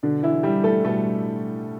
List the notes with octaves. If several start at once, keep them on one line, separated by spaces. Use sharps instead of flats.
B2 D3 D4
E3 E4
G3 G4
A3 A4
B2 A3 A4